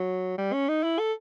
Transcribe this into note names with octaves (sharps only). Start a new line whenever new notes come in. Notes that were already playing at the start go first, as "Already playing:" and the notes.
Already playing: F#3
G3
C#4
D#4
E4
A4